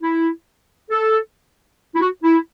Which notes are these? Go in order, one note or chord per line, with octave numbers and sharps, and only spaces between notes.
E4
A4
E4
F#4
E4